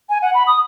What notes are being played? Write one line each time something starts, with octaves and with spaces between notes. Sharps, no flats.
G#5
F#5
B5
D#6